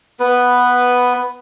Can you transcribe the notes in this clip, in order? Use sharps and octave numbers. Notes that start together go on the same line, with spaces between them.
B3 B4